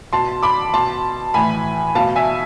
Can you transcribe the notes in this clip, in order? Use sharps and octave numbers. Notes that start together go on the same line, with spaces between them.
B2 A5 C6
B5 D6
B2 A5 C6
A2 E3 G#5 B5
B2 F5 A5
E5 G#5